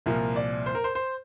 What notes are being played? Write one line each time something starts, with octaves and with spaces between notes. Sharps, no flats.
C2 A#2 F3 A#4
D5
C5
A#4
C5
C5